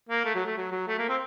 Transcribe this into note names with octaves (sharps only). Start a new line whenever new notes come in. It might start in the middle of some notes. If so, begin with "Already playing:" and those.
A#3
A3
F#3
A3
F#3
F#3
A3
A#3
C4